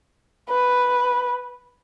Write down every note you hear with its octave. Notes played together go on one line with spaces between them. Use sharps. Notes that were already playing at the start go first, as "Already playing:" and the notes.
B4